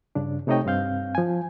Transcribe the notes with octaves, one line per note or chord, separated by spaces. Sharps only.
G2 C#3 D4
C3 A3 D#4 C#5 D#5 G5
G2 C4 F5 G6
F3 G#5